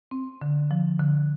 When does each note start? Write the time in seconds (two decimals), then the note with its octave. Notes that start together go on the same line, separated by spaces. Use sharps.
0.11 C4
0.42 D3
0.71 F3
1.00 D3